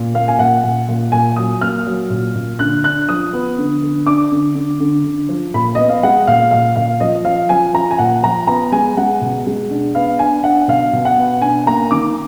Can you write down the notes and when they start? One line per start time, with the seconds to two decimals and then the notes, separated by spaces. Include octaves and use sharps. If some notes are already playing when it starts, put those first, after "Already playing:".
Already playing: A#2
0.14 A#3 F5
0.28 G#5
0.39 A#2 F#5
0.63 A#2
0.88 A#2
1.12 A#2 G#5
1.36 F#3 D#6
1.61 A#3 F6
1.87 F#3
2.10 A#2
2.35 A#2
2.59 D3 F#6
2.84 D4 F#6
3.09 F3 D#6
3.33 B3
3.58 D3
3.82 D3
4.06 D4 D6
4.32 D3
4.55 D3
4.80 D3
5.04 D3
5.29 F3
5.54 A#2 B5
5.75 B3 D#5
5.89 F5
6.03 G#3 F#5
6.27 A#2 F5
6.51 A#2 F5
6.76 A#2 F5
7.00 F3 D#5
7.25 F3 F5
7.49 F3 G#5
7.74 F3 A#5
7.91 G#5
7.98 A#2 F#5
8.23 F3 A#5
8.47 B3 A#5
8.72 G#3 G#5
8.97 G#3 F#5
9.22 B2
9.47 G#3
9.70 D4
9.95 B3 F5
10.19 D4 G#5
10.44 D4 F#5
10.68 B2 F5
10.93 B2
11.05 F#5
11.18 B3
11.41 D4 G#5
11.66 A#3 A#5
11.91 D#3 D6